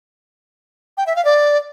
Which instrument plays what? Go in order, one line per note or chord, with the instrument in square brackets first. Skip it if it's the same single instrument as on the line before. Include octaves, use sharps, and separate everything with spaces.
[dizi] G5
E5
F5
D5